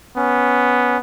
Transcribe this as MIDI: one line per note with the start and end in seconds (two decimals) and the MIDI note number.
0.16 0.99 59
0.16 0.98 61